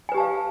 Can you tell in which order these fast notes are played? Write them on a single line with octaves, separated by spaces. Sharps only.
G#5 B4 G4 A5 F5